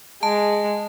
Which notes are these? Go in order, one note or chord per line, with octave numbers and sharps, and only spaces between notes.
G#3 A5